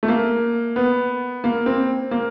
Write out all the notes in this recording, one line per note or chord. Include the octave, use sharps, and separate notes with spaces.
A3
A#3
B3
A#3
C4
A#3